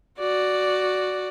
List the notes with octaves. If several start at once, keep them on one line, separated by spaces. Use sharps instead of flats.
F#4 D5